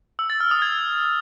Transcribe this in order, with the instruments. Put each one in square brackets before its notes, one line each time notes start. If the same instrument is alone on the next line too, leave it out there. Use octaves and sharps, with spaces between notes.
[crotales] E6
A6
F6
D#6
G#6